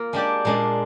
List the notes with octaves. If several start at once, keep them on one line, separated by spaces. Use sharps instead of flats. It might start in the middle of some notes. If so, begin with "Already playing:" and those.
Already playing: A#3 F4 A#4
G#3 D4 G4 D5
A#2 G#3 D4